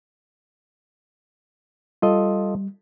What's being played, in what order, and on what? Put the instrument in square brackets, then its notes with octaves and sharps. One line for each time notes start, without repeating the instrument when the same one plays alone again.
[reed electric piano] G3 [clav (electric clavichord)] F4 A4 D#5